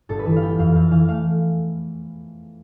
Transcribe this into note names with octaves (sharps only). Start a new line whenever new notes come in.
G1 A4
B4
E3 A4
F5
B3 G5
F2 F5
F2 F5
E3 F5
A3 F5